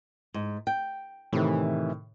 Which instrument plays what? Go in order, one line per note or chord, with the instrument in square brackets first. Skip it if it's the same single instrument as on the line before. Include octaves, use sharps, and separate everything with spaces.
[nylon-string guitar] G#2
G5
[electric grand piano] A2 C3 D#3 [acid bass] E3